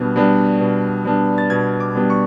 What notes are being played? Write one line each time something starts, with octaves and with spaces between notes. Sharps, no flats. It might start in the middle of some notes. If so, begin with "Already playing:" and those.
Already playing: B2 G3 B3 D4
G3 B3 D4
B2
G3 B3 D4
A6
B2 G#6
D6
G3 B3 D4
C#6